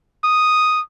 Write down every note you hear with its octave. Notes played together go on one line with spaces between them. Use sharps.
D#6